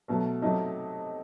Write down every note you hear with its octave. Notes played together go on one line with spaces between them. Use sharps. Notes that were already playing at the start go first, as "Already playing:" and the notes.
B2 F#3 A3
C3 F#3 A3 D#4